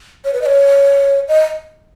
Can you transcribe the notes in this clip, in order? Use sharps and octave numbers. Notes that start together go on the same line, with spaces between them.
C#5
B4
D#5
C#5
D#5